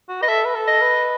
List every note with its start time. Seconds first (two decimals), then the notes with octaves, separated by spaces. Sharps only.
0.09 F#4
0.22 B4 D#5
0.28 A4 E5
0.45 B4
0.55 A4
0.68 D#5
0.82 B4